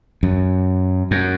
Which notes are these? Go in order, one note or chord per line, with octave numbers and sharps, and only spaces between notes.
F#2
F#2